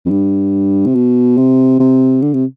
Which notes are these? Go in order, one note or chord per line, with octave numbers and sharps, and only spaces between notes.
F2
G2
C3
B2
C3
C3
D3
C3